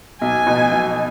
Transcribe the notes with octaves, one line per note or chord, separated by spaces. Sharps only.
B1 G#5
B2
B1